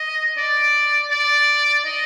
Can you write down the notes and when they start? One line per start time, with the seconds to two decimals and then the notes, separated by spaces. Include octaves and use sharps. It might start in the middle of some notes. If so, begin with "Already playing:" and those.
Already playing: D#5
0.37 D5
1.11 D5
1.85 D#5